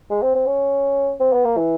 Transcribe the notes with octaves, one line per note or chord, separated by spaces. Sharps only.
G#3
C4
C4
C#4
C4
B3
A#3
E3